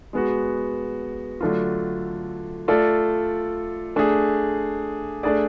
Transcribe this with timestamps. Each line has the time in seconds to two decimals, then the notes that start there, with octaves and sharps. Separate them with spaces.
0.13 G#3 B3 F#4
1.41 D3 F#3 A3 D4 F4
2.68 A3 F4 A4 D5
3.96 A3 D4 G#4
5.23 A3 D4 G#4 D5